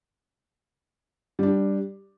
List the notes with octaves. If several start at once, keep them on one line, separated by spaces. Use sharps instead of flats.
G3 D4 G4